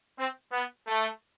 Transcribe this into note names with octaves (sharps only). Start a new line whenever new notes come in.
C4
B3
A3